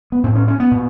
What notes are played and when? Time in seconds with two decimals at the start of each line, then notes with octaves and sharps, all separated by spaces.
0.12 B3
0.24 A2 C4
0.35 C#4
0.48 C#4
0.60 B3
0.71 A#2